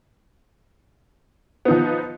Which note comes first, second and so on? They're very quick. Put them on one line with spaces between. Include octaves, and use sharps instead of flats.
B3 D#4 F3